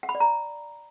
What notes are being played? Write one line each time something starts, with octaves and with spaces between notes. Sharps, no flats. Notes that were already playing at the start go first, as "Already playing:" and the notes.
F#5
B5
D5
A#5